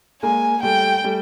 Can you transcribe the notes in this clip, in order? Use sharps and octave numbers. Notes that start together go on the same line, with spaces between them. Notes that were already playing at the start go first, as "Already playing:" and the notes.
G#3 A#3 G#5
G3 A3 G5
G3 A3